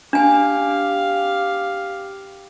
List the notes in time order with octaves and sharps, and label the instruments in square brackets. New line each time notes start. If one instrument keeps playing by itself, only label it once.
[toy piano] D4 G#5 [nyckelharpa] G4 F5